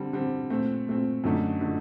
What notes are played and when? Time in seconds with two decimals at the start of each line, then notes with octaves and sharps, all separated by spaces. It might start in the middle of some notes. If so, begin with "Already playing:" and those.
Already playing: D3 G3 C4
0.13 D3 G3 C4
0.50 A#2 A3 C4
0.87 A#2 A3 C4
1.24 F#2 D3 A3 D#4
1.61 D3 A3 D#4